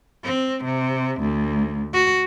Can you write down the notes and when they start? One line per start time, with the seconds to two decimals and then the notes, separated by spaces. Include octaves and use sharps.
0.25 C4
0.65 C3
1.21 D2
1.94 F#4